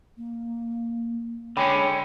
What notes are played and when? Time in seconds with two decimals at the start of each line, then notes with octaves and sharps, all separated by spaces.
0.17 A#3
1.57 D3 G#3 C#4 C#5 G5 B5